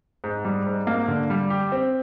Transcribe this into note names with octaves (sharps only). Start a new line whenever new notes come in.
G#2
G3
G#2
A#3
D3
G3
G4
C4